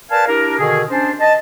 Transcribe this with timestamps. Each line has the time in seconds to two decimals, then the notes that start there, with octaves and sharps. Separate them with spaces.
0.11 A#4 B4 D5 F5 G#5 A5
0.28 D4 E4 G4 A#4
0.59 B2 D3 D#3 G#4
0.90 C#4 D4 C5
1.20 D#5 A5